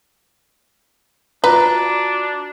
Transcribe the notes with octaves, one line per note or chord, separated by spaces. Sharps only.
D4 F4 F#4 B4 A#5